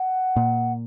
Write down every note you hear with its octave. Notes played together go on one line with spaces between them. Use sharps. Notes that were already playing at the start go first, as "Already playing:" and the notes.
Already playing: F#5
A#2